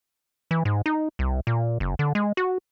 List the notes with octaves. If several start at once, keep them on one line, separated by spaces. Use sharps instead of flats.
E3
G#2
D#4
C2
A#2
F#1
D3
G#3
F#4